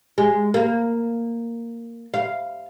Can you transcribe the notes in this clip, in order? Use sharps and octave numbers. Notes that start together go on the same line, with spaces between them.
G#3
A#3
F5